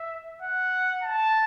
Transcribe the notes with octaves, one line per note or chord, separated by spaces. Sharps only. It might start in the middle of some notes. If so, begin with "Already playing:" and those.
Already playing: E5
F#5
A5